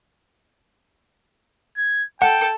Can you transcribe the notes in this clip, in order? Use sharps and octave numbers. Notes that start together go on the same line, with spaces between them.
G#6
A4 F#5 G5